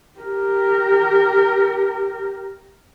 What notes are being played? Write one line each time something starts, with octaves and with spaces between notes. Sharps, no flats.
G4 A#4